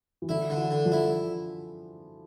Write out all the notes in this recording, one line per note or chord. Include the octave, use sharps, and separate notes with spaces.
E3
D3 E4
D3
E3
D3
F3
E4